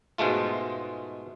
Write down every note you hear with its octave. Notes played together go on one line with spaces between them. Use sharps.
G#2 B2 G#3 A3 F4